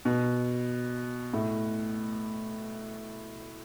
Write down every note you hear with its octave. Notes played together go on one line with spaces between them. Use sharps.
B2
A2